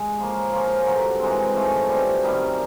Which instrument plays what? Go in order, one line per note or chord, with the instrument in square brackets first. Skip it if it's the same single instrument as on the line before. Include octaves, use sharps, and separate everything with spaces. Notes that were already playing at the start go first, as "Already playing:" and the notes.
Already playing: [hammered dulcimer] G#3
C#3 F3 A#3
F3 A#3 C#4 F4
G2 D3 F#3
E3 G#3 C4
G#2 F3 A3 C#4
B2 G3 C4
F#2 D#3 G3